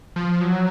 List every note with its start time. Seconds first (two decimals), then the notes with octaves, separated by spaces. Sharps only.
0.16 F3
0.41 F#3